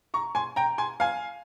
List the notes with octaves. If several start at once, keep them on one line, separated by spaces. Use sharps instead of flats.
A#5 C#6
G#5 C6
G5 A#5
G#5 C6
F5 G#5